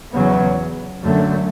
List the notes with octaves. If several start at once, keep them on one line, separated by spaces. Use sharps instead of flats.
E2 C#3 F#3 B3
F#2 D3 F#3 A3